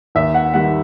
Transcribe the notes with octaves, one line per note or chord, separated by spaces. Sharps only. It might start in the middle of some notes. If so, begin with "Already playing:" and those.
D#2 E5
F#5
D#3 G3 F#5